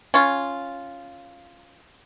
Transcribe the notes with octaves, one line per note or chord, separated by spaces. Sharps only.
C#4 F4